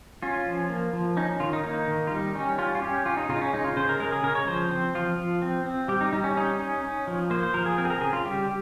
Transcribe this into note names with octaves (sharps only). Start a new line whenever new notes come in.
C#4 F4
F3
A#3
F3
C#4 D#4
D#3 F4
D#4
A#3 D#4
D#3
F4
G3 D#4
G3 C#4
C#4 F4
F4
C#4 G4
C#4 F4
D#4
C#3 F4
D#4
C#4
G#3 D#4
F4
C#3 C5
A#4
G#3 A#4
G#4
C#3 A#4
C#5
F3 C5
C4 C5
F3 F4
F3
C4
C4
G3 G4
D#4
G3 D#4
C#4
C#4 D#4
C#4
C#4
F3
A#3 C5
C5
F3 A#4
G#4
C4 A#4
G#4
A#4
C#3 G#4
F4
G3 G4